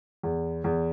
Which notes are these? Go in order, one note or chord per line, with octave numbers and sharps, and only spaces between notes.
E2
E2